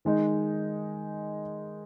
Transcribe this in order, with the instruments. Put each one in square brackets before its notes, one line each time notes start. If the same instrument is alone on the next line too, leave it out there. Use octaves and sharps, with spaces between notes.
[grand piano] D#3 G#3 D#4